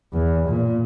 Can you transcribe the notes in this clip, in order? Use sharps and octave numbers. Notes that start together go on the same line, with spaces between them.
E2
A#2